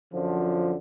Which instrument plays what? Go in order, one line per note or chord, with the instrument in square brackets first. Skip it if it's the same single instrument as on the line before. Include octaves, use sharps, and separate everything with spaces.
[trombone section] F#2 D3 F3